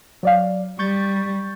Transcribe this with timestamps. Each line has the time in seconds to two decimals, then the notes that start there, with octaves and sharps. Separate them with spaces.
0.23 F#3 D5 F5
0.79 G3 C#6 G6 A6